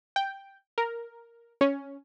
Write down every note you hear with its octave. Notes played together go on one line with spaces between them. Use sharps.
G5
A#4
C#4